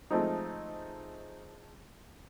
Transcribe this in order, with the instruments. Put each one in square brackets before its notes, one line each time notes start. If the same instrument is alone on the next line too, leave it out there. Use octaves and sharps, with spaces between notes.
[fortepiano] F3 G#3 A3 C4 D#4